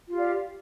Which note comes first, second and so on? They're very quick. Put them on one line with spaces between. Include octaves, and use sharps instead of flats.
F4 G4 F5 D5